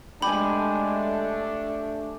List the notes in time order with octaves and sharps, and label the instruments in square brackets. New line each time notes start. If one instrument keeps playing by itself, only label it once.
[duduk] G#3 [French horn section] A3 D4 [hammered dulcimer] G4 G#5 [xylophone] B5